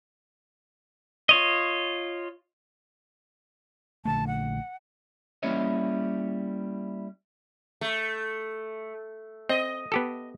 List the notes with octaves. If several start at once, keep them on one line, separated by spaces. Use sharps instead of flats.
F4 C#5 D#5
A#1 D3 A3 A5
F#5
G3 A#3 C#4 E4 C#5 D#5
A3
C4 D#5
B3 G4 A4